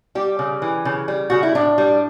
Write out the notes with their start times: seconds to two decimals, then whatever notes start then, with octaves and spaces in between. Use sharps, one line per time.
0.15 G3 G4
0.39 C#3
0.62 E3
0.85 C#3
1.08 G3
1.30 C#3 F#4
1.43 E4
1.55 A2 D4
1.78 G3